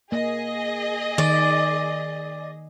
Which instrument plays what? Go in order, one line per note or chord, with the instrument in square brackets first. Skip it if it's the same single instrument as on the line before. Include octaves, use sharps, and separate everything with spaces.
[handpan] A#3 [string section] G#4 D#5
[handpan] D#3 [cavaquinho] D5